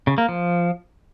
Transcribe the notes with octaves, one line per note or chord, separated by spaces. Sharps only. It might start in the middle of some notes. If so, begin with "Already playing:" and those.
C#3
A#3
F3